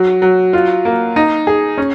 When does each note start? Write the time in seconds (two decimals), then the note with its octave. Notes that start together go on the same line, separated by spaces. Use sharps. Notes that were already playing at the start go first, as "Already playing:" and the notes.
Already playing: F#3
0.22 F#3
0.53 F4
0.85 A#3
1.16 D#4
1.47 G#4
1.78 C#4